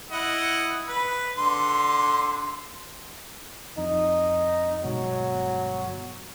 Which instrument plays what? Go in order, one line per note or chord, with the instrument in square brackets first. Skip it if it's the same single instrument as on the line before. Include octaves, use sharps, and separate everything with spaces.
[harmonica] E4 D#5 F#5
B4
D3 C6
[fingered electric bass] F2 [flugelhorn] D#4
[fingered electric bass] G1 B2 G#3 [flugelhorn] F#3